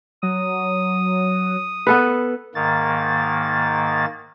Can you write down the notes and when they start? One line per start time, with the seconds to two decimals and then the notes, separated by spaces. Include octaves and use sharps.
0.23 F#3 D#6
1.87 B3 A4 B4
2.55 G#2 D#3 A#3 A6